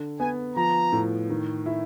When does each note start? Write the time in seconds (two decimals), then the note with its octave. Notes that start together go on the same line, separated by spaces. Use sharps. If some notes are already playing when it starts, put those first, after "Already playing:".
Already playing: D3
0.19 B3 G#5
0.56 F3 A#5
0.92 A2
1.29 D#3
1.66 E4